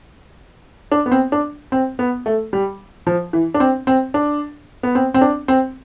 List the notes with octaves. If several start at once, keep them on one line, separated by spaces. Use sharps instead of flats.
D4
B3
C4
D4
C4
B3
A3
G3
F3
E3
D4
C4
C4
D4
B3
C4
C4
D4
C4